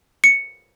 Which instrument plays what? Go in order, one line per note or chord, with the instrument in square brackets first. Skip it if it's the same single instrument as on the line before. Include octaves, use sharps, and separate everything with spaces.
[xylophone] C#7